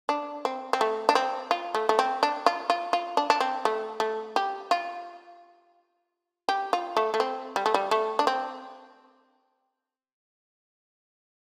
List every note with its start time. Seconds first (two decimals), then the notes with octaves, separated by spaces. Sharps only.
0.09 D4
0.45 C4
0.73 C4
0.81 A3
1.09 D4
1.15 C4
1.51 F4
1.75 A3
1.89 A3
1.99 C4
2.23 D4
2.46 F4
2.70 F4
2.93 F4
3.17 D4
3.30 D4
3.40 C4
3.65 A3
4.00 A3
4.36 G4
4.71 F4
6.49 G4
6.73 F4
6.97 A3
7.14 A3
7.20 C4
7.56 G3
7.66 A3
7.74 G3
7.91 A3
8.19 D4
8.27 C4